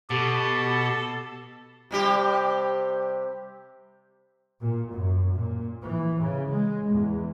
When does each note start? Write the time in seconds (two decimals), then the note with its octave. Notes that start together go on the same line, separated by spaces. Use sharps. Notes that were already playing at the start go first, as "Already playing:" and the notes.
0.10 B2 G4 A4
1.91 C3 G3 G4
4.61 A#2
4.92 F#2
5.34 A#2
5.81 E3
6.19 C#3
6.51 G#3
6.91 E2